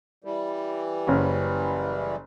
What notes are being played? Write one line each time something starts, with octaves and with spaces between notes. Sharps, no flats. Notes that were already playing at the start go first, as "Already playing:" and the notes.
E3 G3
F#1 C#4